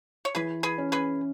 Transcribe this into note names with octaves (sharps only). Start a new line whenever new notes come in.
C#5
E3 G#4 B4
G#4 B4
C#4
G#4 B4